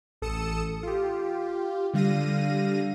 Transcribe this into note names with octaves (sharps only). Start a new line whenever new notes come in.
A1 A4 D#6 C#7 E7
F4 G4
D3 G3 F5 A#6 D#7